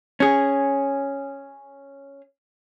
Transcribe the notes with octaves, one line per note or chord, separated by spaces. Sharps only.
C#4 G#4